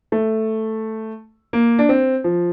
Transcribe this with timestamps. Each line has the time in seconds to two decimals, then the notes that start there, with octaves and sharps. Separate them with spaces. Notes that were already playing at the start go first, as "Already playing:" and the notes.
0.12 A3
1.53 A#3
1.79 D4
1.89 C4
2.24 F3